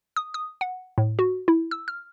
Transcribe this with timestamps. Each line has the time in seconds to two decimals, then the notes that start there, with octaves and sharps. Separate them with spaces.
0.16 D#6
0.34 D#6
0.61 F#5
0.98 A2
1.19 F#4
1.48 E4
1.71 E6
1.88 F6